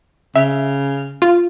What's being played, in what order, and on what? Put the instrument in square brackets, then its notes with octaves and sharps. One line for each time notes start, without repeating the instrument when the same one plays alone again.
[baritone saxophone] C#3 [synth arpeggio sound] E5
[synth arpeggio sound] F4